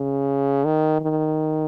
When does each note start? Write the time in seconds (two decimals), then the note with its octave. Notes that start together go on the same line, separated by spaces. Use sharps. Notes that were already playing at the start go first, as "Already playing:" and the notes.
Already playing: C#3
0.65 D#3
1.01 D#3